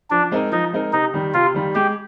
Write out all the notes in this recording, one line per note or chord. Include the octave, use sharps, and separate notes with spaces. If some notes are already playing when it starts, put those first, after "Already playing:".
F3 D4
G#3 C4 D#4 A#4
F3 D#4
G#3 C4 D#4 A#4
C3 D#4
D#3 G3
C3 F4
D#3 G3
G#3 G4